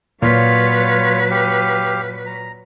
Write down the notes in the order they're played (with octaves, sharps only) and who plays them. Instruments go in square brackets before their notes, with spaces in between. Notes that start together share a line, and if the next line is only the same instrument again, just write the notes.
[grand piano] A#2 [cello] F#3 B4 [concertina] F4 C#5 F5
[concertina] G4 F5
A#5